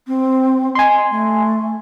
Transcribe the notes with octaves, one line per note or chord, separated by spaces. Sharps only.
C4
D#5 G#5 C6
A3